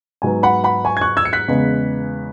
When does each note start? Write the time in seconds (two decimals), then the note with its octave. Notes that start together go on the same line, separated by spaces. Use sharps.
0.22 G#2 F#3 B3 G#5
0.43 F#5 B5
0.64 F#5 B5
0.85 G#5 C#6
0.97 G#6
1.01 C#6 F#6
1.17 E6 G#6
1.25 C#7
1.33 F#6 B6
1.48 E2 C#3 G#3 B3